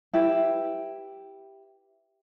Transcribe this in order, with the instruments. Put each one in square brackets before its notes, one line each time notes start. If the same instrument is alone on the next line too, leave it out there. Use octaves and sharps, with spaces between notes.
[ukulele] E4 G4 B4